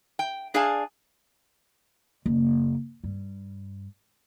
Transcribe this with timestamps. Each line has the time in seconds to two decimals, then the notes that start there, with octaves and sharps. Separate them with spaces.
0.19 G5
0.54 D4 G#4 D5 F5 G#5 A5
2.26 F#1
3.04 G2